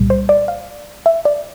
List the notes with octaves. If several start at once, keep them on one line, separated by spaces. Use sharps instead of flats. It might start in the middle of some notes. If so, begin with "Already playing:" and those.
Already playing: C2 A#2 G3
C5
D5
F5
E5
D5